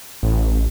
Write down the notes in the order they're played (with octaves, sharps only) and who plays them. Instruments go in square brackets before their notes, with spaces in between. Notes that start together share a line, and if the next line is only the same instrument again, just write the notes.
[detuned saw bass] A1